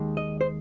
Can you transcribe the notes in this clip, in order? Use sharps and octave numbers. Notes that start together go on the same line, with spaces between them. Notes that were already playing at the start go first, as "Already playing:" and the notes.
Already playing: D#2 D#3 G#3
D#5
C5